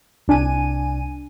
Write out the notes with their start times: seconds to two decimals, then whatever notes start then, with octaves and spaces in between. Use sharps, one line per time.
0.28 C2 D4 G#5 D#7